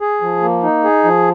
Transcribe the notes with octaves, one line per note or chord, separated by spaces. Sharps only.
G#4
F3
A#3
D#4
G#4
F3